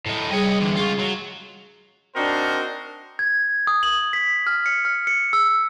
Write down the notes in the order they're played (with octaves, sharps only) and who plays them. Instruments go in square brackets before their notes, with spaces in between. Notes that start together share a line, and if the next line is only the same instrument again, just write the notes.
[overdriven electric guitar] A2 D#4
[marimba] G3 G#4 [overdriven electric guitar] C#5 D#5
[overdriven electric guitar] E2 D3
[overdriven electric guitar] C#2 F4 [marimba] G#4 C#6
[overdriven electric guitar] F#3
[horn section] C4 D4 D#4 F#4 A#4 C5
[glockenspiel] G#6
D#6
F#7
B6
F6
C#7
F6
C#7
E6